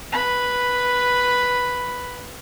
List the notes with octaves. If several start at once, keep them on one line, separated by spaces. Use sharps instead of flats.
B4 B5